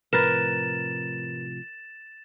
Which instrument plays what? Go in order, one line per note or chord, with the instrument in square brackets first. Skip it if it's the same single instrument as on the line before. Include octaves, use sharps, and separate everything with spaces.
[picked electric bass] A2 C3 F3 [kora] A#4 B4 [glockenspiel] A6 E7